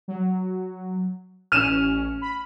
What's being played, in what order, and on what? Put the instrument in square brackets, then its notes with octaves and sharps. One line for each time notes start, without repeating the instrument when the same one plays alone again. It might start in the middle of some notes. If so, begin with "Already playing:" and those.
[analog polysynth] F#3
[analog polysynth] A1 C#4 [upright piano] F6 D#7 E7
[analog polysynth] B5